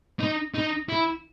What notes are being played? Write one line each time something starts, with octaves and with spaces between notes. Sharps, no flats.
D#4
D#4
E4